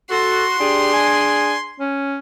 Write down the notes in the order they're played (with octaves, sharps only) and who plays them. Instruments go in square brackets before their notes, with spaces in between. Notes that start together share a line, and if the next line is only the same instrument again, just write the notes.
[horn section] F#4 [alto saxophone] A4 [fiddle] C6
[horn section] D4 G#4 [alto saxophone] G4
[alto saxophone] G#5
C#4